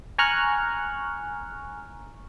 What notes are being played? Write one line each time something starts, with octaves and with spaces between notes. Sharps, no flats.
G#5 A#5 C#6 F6 F#6